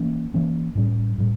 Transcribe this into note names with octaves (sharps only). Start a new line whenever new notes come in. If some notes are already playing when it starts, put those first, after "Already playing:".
Already playing: E3 A#3 C#4
E3 A#3 C#4
A2 G3 C#4
A2 G3